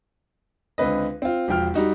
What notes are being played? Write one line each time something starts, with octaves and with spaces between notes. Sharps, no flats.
C#2 D3 C4 B4 D#5
C4 F4
E1 F3 G5 F6
G3 D#4 F#4